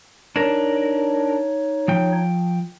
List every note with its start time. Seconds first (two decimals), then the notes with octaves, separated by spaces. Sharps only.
0.36 D4 D#4 A#4 C#5
1.88 F3 G5